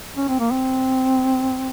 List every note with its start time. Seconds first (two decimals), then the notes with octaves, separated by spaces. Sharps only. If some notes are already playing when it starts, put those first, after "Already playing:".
0.17 C#4
0.29 C4
0.40 A#3
0.51 C4